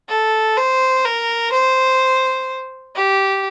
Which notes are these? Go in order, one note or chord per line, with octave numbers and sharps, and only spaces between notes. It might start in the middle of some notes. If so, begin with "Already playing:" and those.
A4
C5
A#4
C5
G4